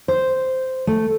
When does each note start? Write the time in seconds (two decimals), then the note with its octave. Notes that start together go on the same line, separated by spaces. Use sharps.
0.08 C5
0.87 A3